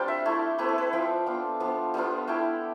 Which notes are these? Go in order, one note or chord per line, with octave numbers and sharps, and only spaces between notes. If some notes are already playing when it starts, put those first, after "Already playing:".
Already playing: G3 C4 D4 F4 G5 A5
E5
A3 E4
A3 C4 E4 B4
A4
B4
F3 C4 F4 G5
B3 D4 F4
F3 B3 D4
G3 B3 D4 F4
A3 E4 G5